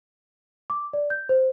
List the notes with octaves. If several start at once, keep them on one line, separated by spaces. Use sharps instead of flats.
D6
D5
G6
C5